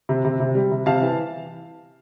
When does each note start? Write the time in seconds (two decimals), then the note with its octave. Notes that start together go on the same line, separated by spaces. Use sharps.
0.09 C3
0.25 C3
0.40 C3
0.55 G3
0.72 C3
0.86 C3 F5 A5
1.02 E3